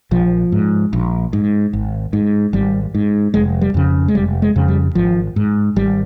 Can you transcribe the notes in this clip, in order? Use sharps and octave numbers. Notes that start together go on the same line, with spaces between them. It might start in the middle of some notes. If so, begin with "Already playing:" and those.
A#1 F3
G#2
A#1
G#2
G#1
G#2
G#1 G3
G#2
F1 G#3
G3
F2 C#3
G#3
F1 G3
G#3
F2 C#3
G3
G#1 F3
G#2
G#1 G3